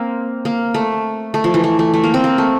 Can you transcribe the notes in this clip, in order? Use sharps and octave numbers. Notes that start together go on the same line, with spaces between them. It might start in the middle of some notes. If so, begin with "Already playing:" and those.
Already playing: A#3 C4
A#3
A3
A3
F3
E3
A3
A3
A3
A#3
C4
A#3
A3